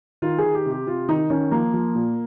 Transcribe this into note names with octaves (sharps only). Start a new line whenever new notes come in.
D#3 F4
G#4
D#3
G4
C3
G4
C3 F4
D#3 D#4
D#3 C#4
F3 A#3
F3
A#2